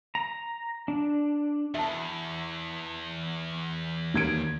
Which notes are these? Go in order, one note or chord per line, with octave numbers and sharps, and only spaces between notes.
A#5
D4
E2 E5 A5
D#2 G#6 D7